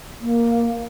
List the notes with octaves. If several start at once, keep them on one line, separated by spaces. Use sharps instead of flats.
A#3